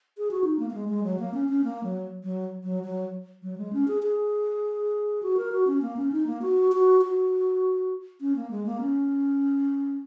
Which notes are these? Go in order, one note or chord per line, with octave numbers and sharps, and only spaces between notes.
G#4
F#4
D#4
A#3
A#3
G#3
G#3
F#3
A#3
C#4
C#4
A#3
F#3
F#3
F#3
F#3
F#3
G#3
C#4
G#4
G#4
F#4
A#4
F#4
C#4
A#3
C#4
D#4
A#3
F#4
F#4
F#4
C#4
A#3
G#3
A#3
C#4